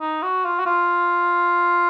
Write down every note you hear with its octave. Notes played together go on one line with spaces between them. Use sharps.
D#4
F#4
F4
F#4
F4